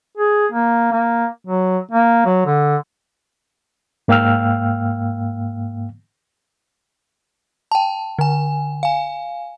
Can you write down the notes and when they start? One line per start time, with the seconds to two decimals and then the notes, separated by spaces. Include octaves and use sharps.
0.17 G#4
0.52 A#3
0.92 A#3
1.47 F#3
1.92 A#3
2.25 F#3
2.46 D3
4.08 G#2 A#3 F5 G5 E6 F6
7.71 G5 A5
8.19 D3 G#5
8.83 F5 G#5